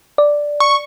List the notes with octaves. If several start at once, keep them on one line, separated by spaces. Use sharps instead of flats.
D5
C#6